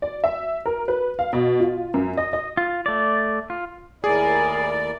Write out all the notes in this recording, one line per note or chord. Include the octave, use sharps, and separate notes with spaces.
D5
E5
A#4
B4
F5
B2
F4
F#2
D#5
D#5
F4
A3 D5
F4
D#2 A2 E4 G#4 A#4 D5 G#5